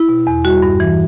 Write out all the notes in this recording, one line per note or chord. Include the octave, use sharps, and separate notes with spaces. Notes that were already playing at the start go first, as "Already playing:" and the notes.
Already playing: E4
B2
E2
G3 F#4
G2
E3